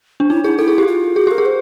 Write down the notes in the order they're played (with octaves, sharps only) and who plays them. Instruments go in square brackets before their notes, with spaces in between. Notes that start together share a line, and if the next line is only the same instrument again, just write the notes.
[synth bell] D4
[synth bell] D#4 [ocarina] E4
[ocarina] E4 [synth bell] G#4
[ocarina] E4 [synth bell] A4
[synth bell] G#4
G4
[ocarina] F4
[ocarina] F#4 [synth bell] G#4
[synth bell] G4 [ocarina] A#4
[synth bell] G#4
[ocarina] C5